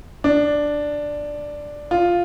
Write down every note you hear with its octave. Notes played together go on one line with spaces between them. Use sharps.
D4
F4